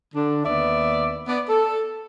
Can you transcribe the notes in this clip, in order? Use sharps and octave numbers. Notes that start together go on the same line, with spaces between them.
D3 D4
D#2 B3 D5 E5
B3 D5
A4